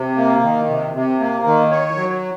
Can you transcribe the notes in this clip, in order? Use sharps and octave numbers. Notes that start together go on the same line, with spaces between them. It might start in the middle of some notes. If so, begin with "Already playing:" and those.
Already playing: C3
A#3
D#3
C3
C3
A#3
D#3
C#5
F#3